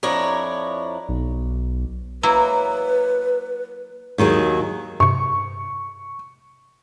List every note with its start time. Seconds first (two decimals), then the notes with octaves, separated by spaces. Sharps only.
0.03 F2 D4 E4 C#5 A#5
1.09 B1
2.23 F#3 A#3 E4 B4
4.18 D#2 D#3 F#3 G#4
5.00 G2 C3 C#6